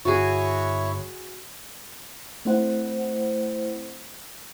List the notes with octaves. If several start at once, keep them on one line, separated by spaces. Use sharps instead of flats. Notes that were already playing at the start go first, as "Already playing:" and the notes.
G1 E4 F#4 G#4 C#5 C#6
A3 C4 E4 C5 F#5